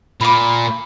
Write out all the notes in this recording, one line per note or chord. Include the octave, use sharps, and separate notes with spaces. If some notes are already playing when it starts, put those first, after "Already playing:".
A#2 B5 D6